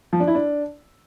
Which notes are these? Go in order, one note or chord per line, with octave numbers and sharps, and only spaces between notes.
F3
D4
E4
D4